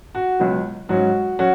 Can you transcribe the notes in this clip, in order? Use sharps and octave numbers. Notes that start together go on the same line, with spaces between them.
F#4
C#2 B2 F#3 B3
G#2 F#3 C#4 F#4
F#3 C#4 F#4